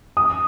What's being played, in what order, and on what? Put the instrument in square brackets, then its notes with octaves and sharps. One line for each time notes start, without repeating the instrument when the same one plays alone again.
[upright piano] D#6